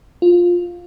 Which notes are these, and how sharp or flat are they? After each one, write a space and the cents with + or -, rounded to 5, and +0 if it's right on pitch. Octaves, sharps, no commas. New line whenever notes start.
F4 +10